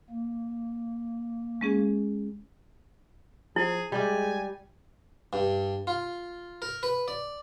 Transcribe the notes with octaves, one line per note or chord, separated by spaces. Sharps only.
A#3
G#3 C#4 G#4
F3 E4 G#4
G3 G#3 G4 G#5
G2
F4
A#4
B4
D5